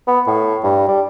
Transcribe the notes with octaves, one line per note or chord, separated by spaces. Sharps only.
B3
A2
G2
G3